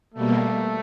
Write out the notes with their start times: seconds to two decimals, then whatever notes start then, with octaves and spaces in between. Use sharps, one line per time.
0.14 B2 G3 A3 A#3